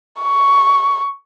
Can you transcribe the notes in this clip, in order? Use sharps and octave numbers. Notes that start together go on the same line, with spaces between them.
C#6